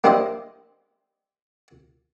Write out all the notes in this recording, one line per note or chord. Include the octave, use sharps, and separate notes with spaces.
A#3 D4 E4 G4 C5 D#5